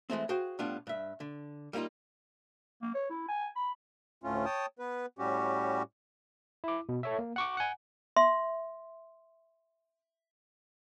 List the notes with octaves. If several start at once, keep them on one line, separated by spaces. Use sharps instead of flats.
E3 G#3 A3 C4
F#4 G#4 C5 F5 G5
A2 G3 B3 D4 F4
G2 E5
D3
G3 A#3 B3 D#4 F4
A#3
C#5
E4
G#5
B5
D2 A2 A3 C#4 F4
C#5 G5 A5 D#6
B3 B4
A2 G3 C#4 F#4 G4
E4 D6
B2
A4 C#5 E5
A#3
F#5 C#6 D6
F#5 G#5
E5 C6